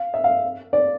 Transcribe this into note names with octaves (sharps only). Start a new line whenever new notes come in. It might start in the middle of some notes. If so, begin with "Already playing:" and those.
Already playing: F5
E5
F5
D5